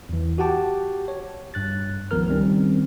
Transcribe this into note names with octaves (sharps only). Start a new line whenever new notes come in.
E2 E3
F#4 G4 F#5 G5 A5 D6
C#5
G2 F#6 A6
C#2 D#3 F3 B3 A#4 F6
D#3 G3 C4 C#4